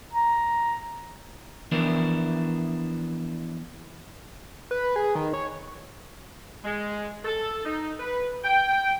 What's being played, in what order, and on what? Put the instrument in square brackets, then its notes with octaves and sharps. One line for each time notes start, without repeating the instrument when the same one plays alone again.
[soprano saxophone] A#5
[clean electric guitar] E3 F3 B3 D4 E4 A#4
[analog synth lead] B4
G#4
D#3
C#5
[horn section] G#3
A4
D#4
B4
G5